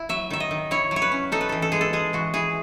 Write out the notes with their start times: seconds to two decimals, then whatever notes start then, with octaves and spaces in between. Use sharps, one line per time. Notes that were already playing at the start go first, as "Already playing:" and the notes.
Already playing: E4
0.09 F#3 E5
0.30 D#3 E5
0.40 D#5
0.51 D#3
0.71 E4 C#5
0.91 F#3
0.96 C#5
1.02 B4
1.12 C#4
1.32 D#4 A4
1.41 B4
1.49 E3 A4
1.62 A4
1.72 G#3 G#4
1.81 A4
1.93 G#3 G#4
2.13 E3 F#4
2.34 E3 G#4